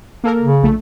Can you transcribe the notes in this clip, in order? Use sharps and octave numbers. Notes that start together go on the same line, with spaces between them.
A#3 A4 A#4
C#3
A#1 A3